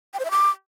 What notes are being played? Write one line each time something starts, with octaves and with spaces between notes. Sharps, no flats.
G5
C5
E5
D6